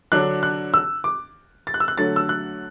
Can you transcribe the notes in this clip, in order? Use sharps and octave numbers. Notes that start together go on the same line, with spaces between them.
D3 F#3 D4 F#6
F#6
E6
D6
A6
F#6
E6
F#6
D3 F#3 A3 A6
E6
F#6